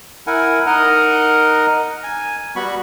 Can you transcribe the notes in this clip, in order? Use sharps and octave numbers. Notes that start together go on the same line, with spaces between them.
E4 A#4 F#5 G#5
D#4 A#4 D#5 F#5 A#5
G#5
G3 B3 F#4 B5 C#6